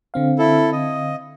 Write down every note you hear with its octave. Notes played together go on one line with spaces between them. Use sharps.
D3 C4 F5
E4 A4
D#5